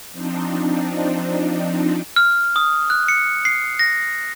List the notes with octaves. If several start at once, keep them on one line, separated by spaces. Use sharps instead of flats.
F3 C4 D4 D#4
F6
D#6
F#6
C#7
C7
A#6